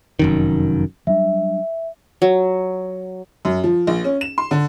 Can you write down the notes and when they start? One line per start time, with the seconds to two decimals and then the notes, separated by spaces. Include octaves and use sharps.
0.19 F1 F#2 D#3
1.07 F#3 G3 D4 E5
2.22 F#3
3.45 F#2
3.64 F3
3.87 A#1
4.04 C#4
4.21 E7
4.38 C6
4.51 D3